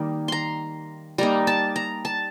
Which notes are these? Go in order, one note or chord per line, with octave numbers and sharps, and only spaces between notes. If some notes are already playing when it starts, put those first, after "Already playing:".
Already playing: D#3 G3 A#3 D#4
A#5 C6
G3 A#3 D#4 A#5
A5
A#5
A5